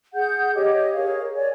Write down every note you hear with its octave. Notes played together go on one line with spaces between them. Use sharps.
G#4 F#5 G6
G4 C#5 D#5
G#4 A#4 C#5 F5
C#5 D5 G#5